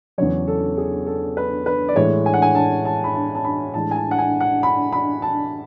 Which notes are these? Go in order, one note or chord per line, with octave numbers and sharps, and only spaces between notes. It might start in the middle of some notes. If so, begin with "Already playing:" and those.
E2 C#3 F#3 C#5
A4
G#4
A4
B4
B4
D5
A2 E3 G#3 C#5
G#5
F#5
G#5
A5
A5
B5
A5
A5
B5
A2 E3 G#3 A5
G#5
A5
F#5
G#5
F#5
B5
B5
A5